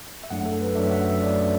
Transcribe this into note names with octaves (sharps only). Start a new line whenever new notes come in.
E5
F#2 F#3 A3 D4 F#5
A4
B4
F#2 F#3 A3 D4 E5
E5
F#5
E5
F#2 F#3 A3 D4 D5
D5